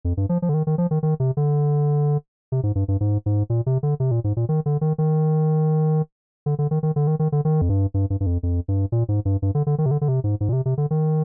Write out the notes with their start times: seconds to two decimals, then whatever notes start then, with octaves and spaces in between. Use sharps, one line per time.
0.05 F2
0.17 G2
0.29 F3
0.42 F3
0.49 D3
0.54 D#3
0.67 D#3
0.78 F3
0.91 D#3
1.03 D#3
1.20 C3
1.37 D3
2.52 C3
2.63 G#2
2.75 G2
2.88 G2
3.01 G#2
3.26 G#2
3.50 A#2
3.66 C3
3.83 D3
4.00 C3
4.11 A#2
4.24 G#2
4.37 A#2
4.49 D#3
4.66 D3
4.81 D#3
4.98 D#3
6.46 D3
6.59 D3
6.71 D#3
6.83 D#3
6.96 D3
7.07 D#3
7.19 D#3
7.32 D3
7.45 D#3
7.62 F2
7.69 G2
7.94 G2
8.10 G2
8.20 G2
8.26 F2
8.43 F2
8.68 G2
8.92 A#2
9.09 G#2
9.25 G2
9.42 G2
9.55 D3
9.67 D3
9.78 D#3
9.86 C3
9.91 D3
10.01 D3
10.08 C3
10.24 G#2
10.41 G#2
10.49 A#2
10.53 C3
10.66 C3
10.78 D3
10.91 D#3